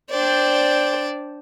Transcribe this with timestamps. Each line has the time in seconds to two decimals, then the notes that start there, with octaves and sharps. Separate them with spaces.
0.11 D4 C5 D5 G5